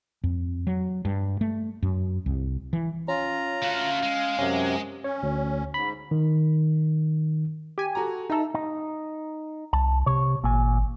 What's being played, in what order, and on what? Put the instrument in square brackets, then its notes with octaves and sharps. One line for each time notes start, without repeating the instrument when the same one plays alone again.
[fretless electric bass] F2
F#3
G2
A3
F#2
C2
E3
[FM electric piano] C#4 [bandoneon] F4 A#5
[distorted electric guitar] A3 F#4 [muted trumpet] F5
[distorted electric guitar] G#3
[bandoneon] F#2 C3 [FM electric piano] C#4
[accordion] C#4 [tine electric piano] C#5
[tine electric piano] D2
[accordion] G#2 [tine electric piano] B5
[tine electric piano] D#3
[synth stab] G4 G#5
[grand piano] F#4 A4 A#5
[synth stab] D#4 A4 [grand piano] E5 A#5
[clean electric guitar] D#4
[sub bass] C2 [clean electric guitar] A5
[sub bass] C3 [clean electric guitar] C#5
[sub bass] G#1 [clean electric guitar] A#2 G#5